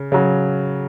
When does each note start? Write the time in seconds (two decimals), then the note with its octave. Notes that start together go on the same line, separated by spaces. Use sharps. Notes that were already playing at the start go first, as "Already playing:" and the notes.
Already playing: C#3
0.12 C#3 F#3